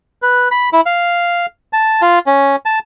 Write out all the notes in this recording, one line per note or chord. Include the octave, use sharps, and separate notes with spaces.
B4
B5
E4
F5
A5
F4
C#4
A5